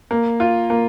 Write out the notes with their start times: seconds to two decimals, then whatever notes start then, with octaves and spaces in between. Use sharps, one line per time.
0.11 A#3
0.40 F4
0.70 A#3